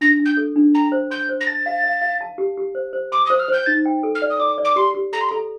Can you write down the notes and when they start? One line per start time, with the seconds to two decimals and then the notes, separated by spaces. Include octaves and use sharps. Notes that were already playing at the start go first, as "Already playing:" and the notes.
0.01 D4 A#6
0.19 D4
0.26 G6
0.37 A4
0.56 D4
0.75 G5 A#5
0.92 C5
1.11 C6 G6
1.29 C5
1.41 A#6
1.47 A5 A6
1.66 F5
1.84 F5
2.02 F5
2.21 A5
2.38 G4
2.57 G4
2.75 C5
2.93 C5
3.12 C6 D6
3.26 C5 D#6
3.39 F6
3.48 C5
3.53 G6
3.66 D#4 A6
3.86 G5
4.03 A4
4.15 F6
4.22 D5
4.30 D#6
4.39 D5 D6
4.58 D5
4.65 D6
4.76 G4 C6
4.94 G4
5.13 A4 A#5
5.21 C6
5.29 A4 A#5